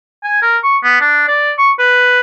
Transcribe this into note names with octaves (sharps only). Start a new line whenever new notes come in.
G#5
A#4
C#6
B3
D4
D5
C#6
B4